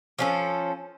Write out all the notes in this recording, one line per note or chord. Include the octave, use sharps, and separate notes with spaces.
F3 C#4 A4